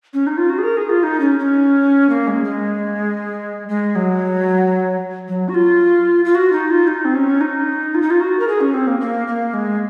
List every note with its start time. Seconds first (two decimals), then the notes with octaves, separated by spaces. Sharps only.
0.14 C#4
0.27 D#4
0.37 F4
0.50 F#4
0.58 G#4
0.63 A#4
0.77 G#4
0.89 F4
1.03 D#4
1.20 C#4
1.39 C#4
2.10 A#3
2.27 G#3
2.44 G#3
3.69 G#3
3.96 F#3
5.28 F#3
5.49 F#4
5.54 F4
6.25 F4
6.35 F#4
6.52 D#4
6.71 F4
6.87 D#4
7.05 C4
7.15 C#4
7.41 D#4
7.95 F4
8.02 D#4
8.10 F4
8.21 F#4
8.39 A#4
8.48 G#4
8.61 C#4
8.74 C4
8.87 A#3
9.00 A#3
9.27 A#3
9.54 G#3